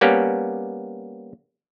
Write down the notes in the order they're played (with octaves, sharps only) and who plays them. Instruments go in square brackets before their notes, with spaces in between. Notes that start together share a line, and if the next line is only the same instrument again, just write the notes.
[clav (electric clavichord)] G3 A#3 B3 C#4 G4